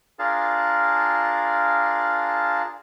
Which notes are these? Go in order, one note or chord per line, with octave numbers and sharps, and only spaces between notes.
D4 F4 G#4 A#4 F5 A5